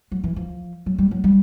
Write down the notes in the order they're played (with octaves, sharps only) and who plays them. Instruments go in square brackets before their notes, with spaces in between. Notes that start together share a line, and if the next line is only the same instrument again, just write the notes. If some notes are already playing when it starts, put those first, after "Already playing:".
[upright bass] F#3
E3
F3
F#3
G3
F#3
G3